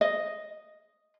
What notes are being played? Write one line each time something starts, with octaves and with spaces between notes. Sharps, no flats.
D#5